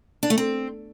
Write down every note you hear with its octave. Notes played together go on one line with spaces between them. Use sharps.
D4
A3
C4